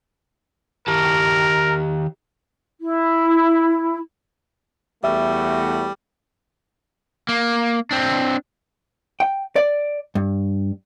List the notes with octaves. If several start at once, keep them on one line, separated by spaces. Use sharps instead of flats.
D#3 G4 A#4 A5
E4
E2 G3 A3 F#4 E5
A#3
C4 D4
G5
D5
G2